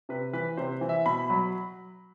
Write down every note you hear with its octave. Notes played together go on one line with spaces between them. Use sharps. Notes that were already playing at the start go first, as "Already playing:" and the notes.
C3 B4
E3 B4
C3 C5
E3
E5
B2 B5
F#3